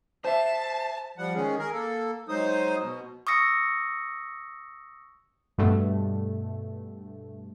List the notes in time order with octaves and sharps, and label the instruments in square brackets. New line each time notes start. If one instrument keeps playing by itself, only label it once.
[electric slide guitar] C5 E5 [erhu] A5
[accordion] F3 G3 F#5
D#3 G#3 C#4 G#4
G#4 A#4
A#3 A4
F#3 G#3 D#4 C5 D#6
B2
[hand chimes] C#6 D#6 E6 A#6 C#7
[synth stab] G2 B2 A3